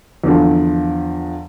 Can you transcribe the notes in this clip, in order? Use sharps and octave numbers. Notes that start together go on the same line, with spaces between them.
E2 D3 F3